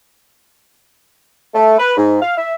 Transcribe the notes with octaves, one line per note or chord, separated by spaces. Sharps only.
A3
B4
G#2
F5
E5